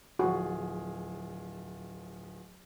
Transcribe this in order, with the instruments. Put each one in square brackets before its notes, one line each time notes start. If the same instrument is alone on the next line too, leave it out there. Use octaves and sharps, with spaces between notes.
[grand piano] D1 F3 G#4 [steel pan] F#4